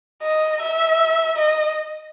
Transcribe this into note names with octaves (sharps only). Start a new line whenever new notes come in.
D#5
E5
D#5